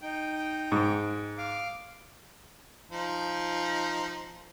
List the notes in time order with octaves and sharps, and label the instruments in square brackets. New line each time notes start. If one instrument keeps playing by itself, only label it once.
[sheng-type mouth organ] D#4 G5
[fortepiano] G#2
[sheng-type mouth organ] F5 D6
[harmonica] F3 D#4